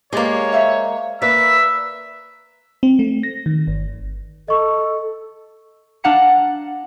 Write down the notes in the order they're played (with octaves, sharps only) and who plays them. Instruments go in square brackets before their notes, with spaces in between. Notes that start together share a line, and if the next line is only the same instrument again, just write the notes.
[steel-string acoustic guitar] G#3 A#3 [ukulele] G4 B4 D5 [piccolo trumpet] C#5
[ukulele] C5 E5 F5
[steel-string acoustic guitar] A#3 B4 [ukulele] D5 [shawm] E5 [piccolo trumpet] E6
[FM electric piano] C4
A3
A#6
D#3
G1
[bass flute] A4 [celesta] D#5 C#6
[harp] D4 F5 F#5 A5 A#5 C#7